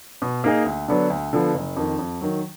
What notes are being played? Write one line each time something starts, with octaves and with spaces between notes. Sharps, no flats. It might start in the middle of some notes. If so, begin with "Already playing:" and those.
B2
A#3 D#4 G#4
D2
D3 F#3 B3 D4
D2
D3 F3 B3
F#1
F2 D#3
F2
D#3 F#3